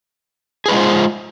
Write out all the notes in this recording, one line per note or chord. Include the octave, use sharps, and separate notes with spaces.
G#3 F4 G#4 B4 C5